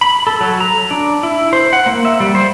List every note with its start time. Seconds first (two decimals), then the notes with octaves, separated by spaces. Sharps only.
0.01 B5
0.27 A4
0.41 F#3
0.61 A#5
0.91 D4
1.23 E4
1.53 C5
1.73 F#5
1.86 A#3
2.05 E5
2.20 G3
2.35 C5